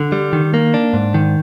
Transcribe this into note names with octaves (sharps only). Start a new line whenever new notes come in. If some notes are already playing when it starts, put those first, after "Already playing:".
Already playing: D3
G3
D#3
A#3
D4
G#2
D#3